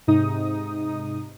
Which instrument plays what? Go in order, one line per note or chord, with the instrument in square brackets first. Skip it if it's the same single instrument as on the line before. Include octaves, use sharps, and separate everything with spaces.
[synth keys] G#2 C3 D#4 D#6